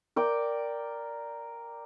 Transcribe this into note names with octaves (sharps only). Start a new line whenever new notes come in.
A#4 D5 G5